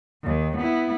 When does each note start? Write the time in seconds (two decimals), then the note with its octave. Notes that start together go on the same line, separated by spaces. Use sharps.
0.23 D#2 D#3
0.57 B3 E4